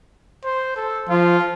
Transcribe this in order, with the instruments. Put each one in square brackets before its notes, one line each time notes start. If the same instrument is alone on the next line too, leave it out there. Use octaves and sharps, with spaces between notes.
[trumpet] C5
A4
[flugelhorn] F3 [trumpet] F4